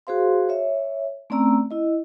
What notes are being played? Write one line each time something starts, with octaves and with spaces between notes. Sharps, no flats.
F#4 G#4 C5 F5 C6
C#5 E5
A3 C4 C#4 D5 A#5 E6
E4 D#5